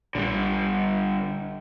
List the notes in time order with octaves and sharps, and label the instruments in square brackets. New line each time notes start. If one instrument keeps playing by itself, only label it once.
[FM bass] A#1 [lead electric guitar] D3 G3